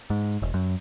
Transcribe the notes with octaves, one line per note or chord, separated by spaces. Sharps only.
G#2
E1
F#2